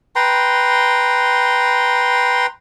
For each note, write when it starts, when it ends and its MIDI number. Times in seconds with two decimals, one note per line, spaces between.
0.16 2.46 71
0.16 2.46 79
0.16 2.46 82
0.16 2.46 84